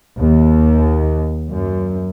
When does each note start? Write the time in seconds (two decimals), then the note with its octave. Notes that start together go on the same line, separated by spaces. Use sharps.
0.16 D#2
1.52 F#2